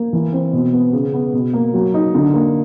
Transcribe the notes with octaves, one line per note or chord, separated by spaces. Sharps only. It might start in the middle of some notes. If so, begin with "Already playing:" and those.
Already playing: A#3
E3
C4
B2
B3
C#3
B3
B2
A#3
F#3
D#4
D3
A#3